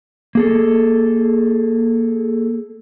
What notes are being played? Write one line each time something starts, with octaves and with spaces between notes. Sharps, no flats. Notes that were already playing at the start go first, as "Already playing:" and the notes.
A#3 G#4 A4